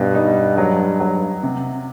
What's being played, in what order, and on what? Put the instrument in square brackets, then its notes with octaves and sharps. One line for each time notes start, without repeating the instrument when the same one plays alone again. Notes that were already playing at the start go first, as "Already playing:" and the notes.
Already playing: [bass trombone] G2 [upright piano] B2
[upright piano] D#4
F#3
F#3
C3